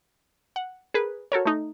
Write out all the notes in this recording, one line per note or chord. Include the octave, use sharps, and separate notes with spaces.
F#5
G#4 A#4 B4
F#4 A4 A#4 C#5
A3 D#4